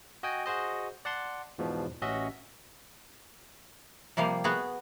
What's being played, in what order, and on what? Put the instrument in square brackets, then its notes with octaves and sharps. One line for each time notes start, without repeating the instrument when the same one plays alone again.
[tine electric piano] F#4 D#5 G5 G#5
F#4 G#4 C5 D#5
D5 F#5 A5 C6
E2 G#2 B2 F3
A1 C#4 F#4 D#5 E5
[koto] C3 F3 G3 A#3 F5
B3 F#4 G#4